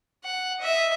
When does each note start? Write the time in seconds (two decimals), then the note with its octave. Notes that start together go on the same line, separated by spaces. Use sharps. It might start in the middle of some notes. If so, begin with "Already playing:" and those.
0.24 F#5
0.60 D#5 E5